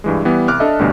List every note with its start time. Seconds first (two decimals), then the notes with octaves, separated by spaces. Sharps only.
0.04 G2 E3 G#3
0.25 E3 G3 B3
0.48 C2 D6 F6 F#6
0.60 D4 A4 D#5 E5
0.79 A1 D2 G2 B2